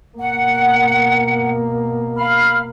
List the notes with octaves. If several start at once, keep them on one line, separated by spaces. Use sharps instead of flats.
B2 A#3 F#5
F5 B5 F6